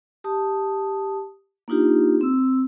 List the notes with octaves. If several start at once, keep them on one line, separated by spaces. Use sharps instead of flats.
G4 A5 D#6
A#3 D4 D#4 F4 G4
C4 E6